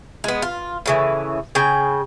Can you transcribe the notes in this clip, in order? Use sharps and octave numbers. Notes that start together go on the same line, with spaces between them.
G#3 B3
F4
A2 C#3 E3
C#3 G#4 G5